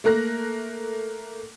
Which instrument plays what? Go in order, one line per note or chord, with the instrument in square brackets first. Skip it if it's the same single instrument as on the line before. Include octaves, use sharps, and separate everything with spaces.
[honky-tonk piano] A3 A#3 A#4 F#6 A#6